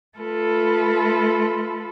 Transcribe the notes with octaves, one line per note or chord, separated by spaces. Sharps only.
A3 F4 A4 B4